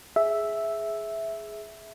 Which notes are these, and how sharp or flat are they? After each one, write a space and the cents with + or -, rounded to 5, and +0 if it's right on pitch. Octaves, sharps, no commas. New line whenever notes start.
G#4 +15 E5 +0